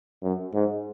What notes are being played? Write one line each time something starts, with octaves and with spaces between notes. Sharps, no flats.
F#2
G#2